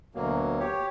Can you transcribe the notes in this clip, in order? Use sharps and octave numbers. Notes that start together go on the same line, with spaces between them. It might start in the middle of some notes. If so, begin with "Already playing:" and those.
D2 B2 F#3 A#3
G4 C#5